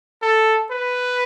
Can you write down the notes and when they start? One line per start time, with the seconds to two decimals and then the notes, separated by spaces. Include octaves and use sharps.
0.22 A4
0.71 B4